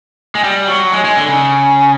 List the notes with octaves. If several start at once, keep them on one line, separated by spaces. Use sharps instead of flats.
G#3
G3
F#3
G#3
G#3
D3
C#3